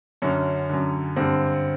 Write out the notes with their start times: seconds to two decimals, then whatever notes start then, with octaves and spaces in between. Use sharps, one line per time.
0.22 F#2 D3 C#4
0.69 F#2 D3
1.16 G2 D3 C4